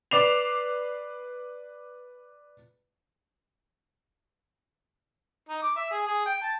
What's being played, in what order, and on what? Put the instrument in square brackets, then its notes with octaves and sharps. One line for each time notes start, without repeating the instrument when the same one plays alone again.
[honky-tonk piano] B4 D5 D6 C7 E7 F7
[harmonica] D#4
D6
E5
G#4
G#4
G5
A5